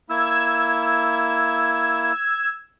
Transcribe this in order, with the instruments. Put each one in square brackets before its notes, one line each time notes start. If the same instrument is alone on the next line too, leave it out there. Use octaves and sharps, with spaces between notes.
[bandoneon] A#3 E4 [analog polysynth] E6 G#6